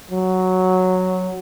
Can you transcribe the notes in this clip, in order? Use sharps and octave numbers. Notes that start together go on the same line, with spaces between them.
F#3